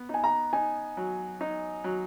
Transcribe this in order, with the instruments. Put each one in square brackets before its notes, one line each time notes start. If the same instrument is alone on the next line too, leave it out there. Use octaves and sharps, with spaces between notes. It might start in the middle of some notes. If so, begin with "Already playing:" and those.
Already playing: [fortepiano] B3
[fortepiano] D#4 [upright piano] G#5
[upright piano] A#5
[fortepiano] D#4 [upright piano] G#5
[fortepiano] F#3
D#4
F#3